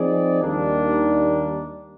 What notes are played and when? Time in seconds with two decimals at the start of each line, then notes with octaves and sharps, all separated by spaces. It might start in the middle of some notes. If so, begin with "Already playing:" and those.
Already playing: F3 C4 D#4 G#4 D5
0.43 D#2 D#3 G3 A#3 D4